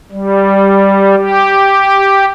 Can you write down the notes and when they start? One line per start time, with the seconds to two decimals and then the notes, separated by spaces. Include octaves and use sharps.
0.12 G3
1.17 G4